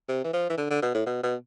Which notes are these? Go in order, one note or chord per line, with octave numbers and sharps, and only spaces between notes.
C3
E3
F3
E3
D3
D3
B2
A2
B2
B2